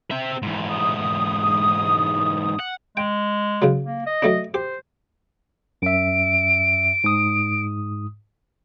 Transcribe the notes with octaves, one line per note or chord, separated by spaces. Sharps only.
C4 E5
G#2 E3
D#6
F#5
G#3 G5
C#3 F#3
A#3
D#5
F#3 A3 D4
G4 C5
F#2 E5 D7
G#2 D#6